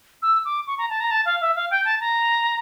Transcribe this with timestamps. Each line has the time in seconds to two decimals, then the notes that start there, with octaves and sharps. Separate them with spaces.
0.22 E6
0.45 D6
0.67 C#6
0.78 A#5
0.90 A5
1.00 A#5
1.11 A5
1.25 F5
1.41 E5
1.55 F5
1.71 G5
1.85 A5
2.00 A#5